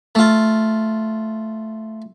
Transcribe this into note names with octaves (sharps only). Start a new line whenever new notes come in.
A3 F4